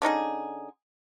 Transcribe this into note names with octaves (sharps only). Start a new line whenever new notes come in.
D3 C#4 D#4 G#4